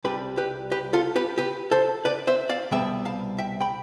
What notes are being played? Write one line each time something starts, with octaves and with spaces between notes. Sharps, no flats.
C2 C3 G3 G4 B4
G4 B4
G4 B4
F4 A4
G4 B4
G4 B4
A4 C5
B4 D5
C5 E5
D5 F5
C2 B2 G3 B3 E5 G5
F5 A5
E5 G5
G5 B5